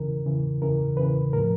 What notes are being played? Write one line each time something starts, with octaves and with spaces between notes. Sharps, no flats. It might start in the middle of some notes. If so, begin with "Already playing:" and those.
Already playing: E2 C#3 E3 A#4
E2 C#3 E3
E2 C#3 E3 A#4
E2 C#3 E3 B4
A2 F3 A#4